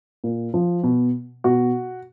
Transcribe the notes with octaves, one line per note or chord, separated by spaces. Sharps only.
A#2
F3
B2
B2 F#4